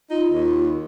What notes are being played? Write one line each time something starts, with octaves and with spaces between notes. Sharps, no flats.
D#4 F4
D#2